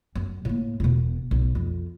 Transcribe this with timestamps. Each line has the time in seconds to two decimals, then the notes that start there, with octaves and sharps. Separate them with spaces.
0.15 F#2
0.45 A2 A#3
0.80 E1 B2
1.31 B1
1.55 F2